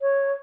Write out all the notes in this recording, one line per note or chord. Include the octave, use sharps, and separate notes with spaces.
C#5